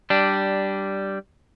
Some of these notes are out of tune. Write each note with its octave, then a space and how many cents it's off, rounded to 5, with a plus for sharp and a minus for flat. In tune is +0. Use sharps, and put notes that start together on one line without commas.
G3 -10 D4 +0